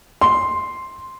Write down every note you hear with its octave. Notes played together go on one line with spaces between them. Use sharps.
C6